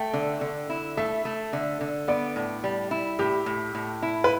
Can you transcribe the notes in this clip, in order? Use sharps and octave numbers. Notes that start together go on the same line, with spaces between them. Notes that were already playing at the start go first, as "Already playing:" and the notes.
Already playing: A3 G5
D3
D3
E4
A3 E5
A3
D3
D3
B3 D5
A2
G3
E4
A2 G4
A2
A2
E4
B4